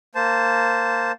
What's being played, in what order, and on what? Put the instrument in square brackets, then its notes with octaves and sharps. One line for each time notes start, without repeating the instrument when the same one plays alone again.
[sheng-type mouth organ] A#3 C5 A5